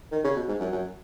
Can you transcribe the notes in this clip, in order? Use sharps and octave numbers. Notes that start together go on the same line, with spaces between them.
D#3
C#3
B2
G#2
F#2
F#2